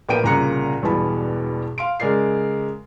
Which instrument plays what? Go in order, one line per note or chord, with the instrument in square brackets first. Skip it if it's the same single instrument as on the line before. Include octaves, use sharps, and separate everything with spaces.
[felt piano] A#1 A#3 B3 G5 D7 D#7
C2 A#2 C#3 A#5 F#6 C#7
E1 G2 B2 E3 A5 B5
F5 C6 D7
C#3 G#3 A#4 D5 C7